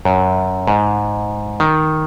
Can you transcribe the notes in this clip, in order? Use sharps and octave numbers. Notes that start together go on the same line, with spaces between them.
F#2
G#2
D#3